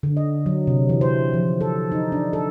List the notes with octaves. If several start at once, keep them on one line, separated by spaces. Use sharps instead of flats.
D3
D#5
F#3
C3
E3
C5
F3
A4
D#4
D4
A4